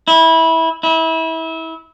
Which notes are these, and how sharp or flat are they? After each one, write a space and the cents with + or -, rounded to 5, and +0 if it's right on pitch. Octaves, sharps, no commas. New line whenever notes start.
E4 -20
E4 -25